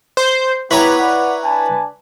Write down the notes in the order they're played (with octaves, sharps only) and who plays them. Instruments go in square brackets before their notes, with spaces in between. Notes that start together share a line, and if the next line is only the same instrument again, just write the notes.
[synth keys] C5 G6
[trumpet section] B3 G4 [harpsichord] E4 C#5 A#5 [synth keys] B4
[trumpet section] D5 F#5
D4 G#5 A5